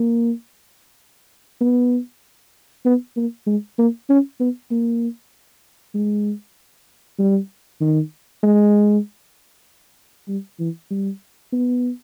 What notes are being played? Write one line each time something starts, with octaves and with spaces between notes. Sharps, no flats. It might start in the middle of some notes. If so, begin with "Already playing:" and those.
Already playing: A#3
B3
B3
A#3
G#3
A#3
C#4
B3
A#3
G#3
G3
D#3
G#3
G3
E3
G3
B3